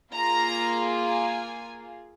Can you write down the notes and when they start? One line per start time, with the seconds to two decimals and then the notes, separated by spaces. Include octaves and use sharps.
0.13 A#3 F4 G#4 A#5
1.02 G#5